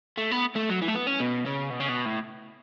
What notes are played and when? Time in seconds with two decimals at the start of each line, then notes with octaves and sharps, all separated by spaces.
0.18 A3
0.31 B3
0.56 A3
0.70 F#3
0.82 E3
0.88 A3
0.95 B3
1.07 C#4
1.20 B2
1.46 C#3
1.71 B2
1.80 C#3
1.89 B2
2.05 A2